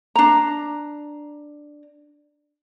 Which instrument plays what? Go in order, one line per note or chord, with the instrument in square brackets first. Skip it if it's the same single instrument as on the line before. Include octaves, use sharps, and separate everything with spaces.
[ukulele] D4 A#5